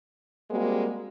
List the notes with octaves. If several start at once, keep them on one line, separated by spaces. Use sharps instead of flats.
G3 G#3 A#3 C4 F#4